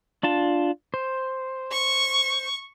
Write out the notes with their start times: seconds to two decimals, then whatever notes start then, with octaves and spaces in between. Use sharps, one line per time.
0.23 D4 F4 A5
0.94 C5
1.71 C#6